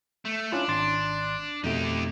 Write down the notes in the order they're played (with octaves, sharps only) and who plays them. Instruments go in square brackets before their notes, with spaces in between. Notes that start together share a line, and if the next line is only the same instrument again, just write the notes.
[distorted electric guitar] A3
[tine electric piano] C#4 E4 F4 [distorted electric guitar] D4
[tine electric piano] G#1 C6 A6
[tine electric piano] F2 B2 A3 [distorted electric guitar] D#4 G4